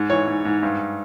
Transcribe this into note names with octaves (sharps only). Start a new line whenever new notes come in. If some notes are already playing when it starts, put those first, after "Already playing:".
Already playing: G#2
E3 C#5
G#2
G#2
G2